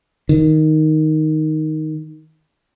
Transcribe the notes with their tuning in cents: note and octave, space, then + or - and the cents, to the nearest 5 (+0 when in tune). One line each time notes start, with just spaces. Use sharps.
D#3 +0